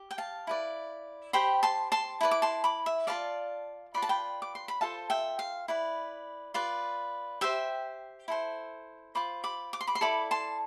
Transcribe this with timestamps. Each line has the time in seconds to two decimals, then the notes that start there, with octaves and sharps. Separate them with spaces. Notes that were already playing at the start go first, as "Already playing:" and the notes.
Already playing: G4
0.11 G5
0.18 F5 A5
0.47 E4 B4 D5
1.33 G4 C5 G5 B5
1.63 A5 C6
1.92 A5 C6
2.21 E4 B4 D5
2.31 D6
2.42 A5 C6
2.64 B5 D6
2.86 E5
3.07 F4 B4 D5 F5 A5
3.94 F4 B4 D5 B5
4.02 A5
4.09 G5 B5
4.42 D6
4.55 C6
4.68 B5
4.81 F4 A4 C5 F5 A5
5.10 E5 G5
5.39 F5
5.68 E4 B4 D5
6.54 F4 B4 D5
7.41 G4 C5 E5 G5
8.28 E4 A4 C5
9.15 F4 C5 B5 D6
9.44 B5 D6
9.73 D6
9.81 C6
9.87 B5 D6
9.95 C6
10.01 E4 A4 D5 B5 D6
10.31 A5 C6